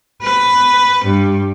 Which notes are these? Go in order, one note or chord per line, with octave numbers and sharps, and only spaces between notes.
B4
G2